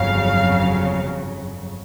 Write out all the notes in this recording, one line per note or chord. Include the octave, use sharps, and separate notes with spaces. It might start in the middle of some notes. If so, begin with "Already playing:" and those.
Already playing: G1 F2 C#3 F#3 F5